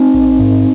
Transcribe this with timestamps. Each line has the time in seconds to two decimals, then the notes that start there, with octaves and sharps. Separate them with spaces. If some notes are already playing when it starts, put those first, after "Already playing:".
Already playing: C4 D#4
0.14 A#1
0.39 G#2